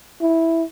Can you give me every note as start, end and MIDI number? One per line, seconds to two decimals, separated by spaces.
0.21 0.63 64